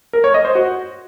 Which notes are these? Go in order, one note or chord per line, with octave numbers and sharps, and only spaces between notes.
A#4
C#5
D#5
C5
F#4